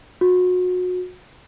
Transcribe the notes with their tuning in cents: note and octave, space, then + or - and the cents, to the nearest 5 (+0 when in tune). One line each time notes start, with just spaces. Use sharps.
F#4 -30